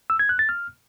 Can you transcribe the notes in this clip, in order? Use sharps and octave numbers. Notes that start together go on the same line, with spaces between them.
E6
G#6
F#6
A6
F6